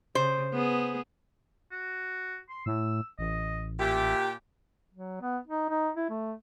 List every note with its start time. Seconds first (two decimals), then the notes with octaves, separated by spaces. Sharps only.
0.15 C#3 C5
0.53 B3 G#4
1.72 F#4
2.49 C6
2.66 A2 E6
3.19 A1 D#5
3.79 A#2 G4 E5
4.93 F#3
5.21 B3
5.47 D#4
5.69 D#4
5.95 E4
6.09 A3